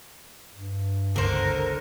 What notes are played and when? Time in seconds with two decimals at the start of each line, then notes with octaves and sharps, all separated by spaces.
0.51 G2
1.16 F#1 C#2 D3 A#4 C5